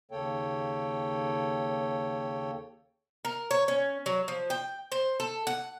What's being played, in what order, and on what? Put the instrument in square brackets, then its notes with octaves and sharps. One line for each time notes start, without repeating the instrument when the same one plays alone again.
[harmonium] D#2 C#3 A#3 A4 C#5 G5
[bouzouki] A#4
C#5
C#4
F#3
F3
G5
C5
A4
F#5